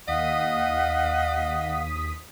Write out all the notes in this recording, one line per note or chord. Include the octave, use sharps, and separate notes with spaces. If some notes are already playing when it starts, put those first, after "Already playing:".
D#2 D#5 F5 F#5 D#6 B6